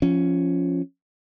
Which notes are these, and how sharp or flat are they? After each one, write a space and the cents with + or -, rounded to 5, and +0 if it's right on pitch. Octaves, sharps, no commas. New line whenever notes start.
F3 -5 C#4 +0